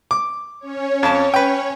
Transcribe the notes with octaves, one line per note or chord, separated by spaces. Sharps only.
D6
C#4 C#5
F2 A5
B4 G5